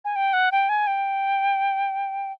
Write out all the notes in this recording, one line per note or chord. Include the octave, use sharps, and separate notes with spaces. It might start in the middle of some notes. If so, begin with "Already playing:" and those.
G#5
G5
F#5
G5
G#5
G5